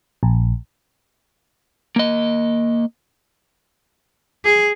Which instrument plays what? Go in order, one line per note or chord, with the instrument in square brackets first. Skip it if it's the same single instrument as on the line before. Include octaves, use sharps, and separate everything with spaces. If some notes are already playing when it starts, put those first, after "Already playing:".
[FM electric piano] A#1
[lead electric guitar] A#3 D#5
[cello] G#4